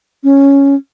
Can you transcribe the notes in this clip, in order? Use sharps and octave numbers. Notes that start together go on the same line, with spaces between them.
C#4